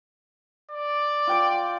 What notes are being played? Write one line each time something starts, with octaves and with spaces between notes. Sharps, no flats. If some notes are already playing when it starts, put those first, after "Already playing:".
D5
F4 G5 D6